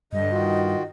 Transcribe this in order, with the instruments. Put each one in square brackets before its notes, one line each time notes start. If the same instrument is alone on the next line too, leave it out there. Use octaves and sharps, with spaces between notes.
[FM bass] G2 [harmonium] D3 [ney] D#5
[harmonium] D#3 F4 F#4